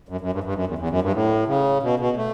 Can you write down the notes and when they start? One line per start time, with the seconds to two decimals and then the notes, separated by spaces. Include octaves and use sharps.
0.09 F#2
0.21 F#2
0.33 G2
0.44 G2
0.55 F#2
0.67 E2
0.78 E2
0.90 F#2
1.02 G2
1.13 A2
1.47 C#3
1.82 B2
1.99 B2
2.17 A3